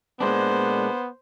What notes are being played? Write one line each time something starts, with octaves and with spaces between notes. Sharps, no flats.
A#2 G#3 B3 D4 C5